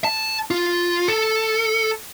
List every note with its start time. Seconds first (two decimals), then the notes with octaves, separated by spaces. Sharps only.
0.04 A5
0.51 F4
1.08 A4